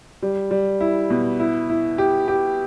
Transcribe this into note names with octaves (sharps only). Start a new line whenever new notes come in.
G3
G3
E4
B2
E4
E4
G4
G4